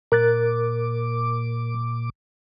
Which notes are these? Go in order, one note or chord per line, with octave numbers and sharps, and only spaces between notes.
A#2 A#4 D6 F#6 A6